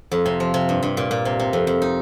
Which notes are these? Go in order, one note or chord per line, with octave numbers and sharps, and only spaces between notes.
F2
C3
F3
C3
G2
G2
A#2
A#2
C3
C3
F2
F2
D#4